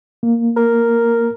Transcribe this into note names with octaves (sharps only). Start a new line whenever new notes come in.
A#3
A#4